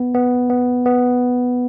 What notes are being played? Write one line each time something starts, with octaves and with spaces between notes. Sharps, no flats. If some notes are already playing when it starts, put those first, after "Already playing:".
Already playing: B3
B3
B3
B3